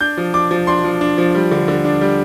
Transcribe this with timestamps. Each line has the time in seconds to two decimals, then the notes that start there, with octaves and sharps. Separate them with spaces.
0.01 D4 G6
0.17 F3
0.34 D4 D6
0.51 F3
0.67 D4 C6
0.84 F3
1.01 D4
1.18 F3
1.35 G3
1.51 D3
1.68 D3
1.85 D4
2.01 G3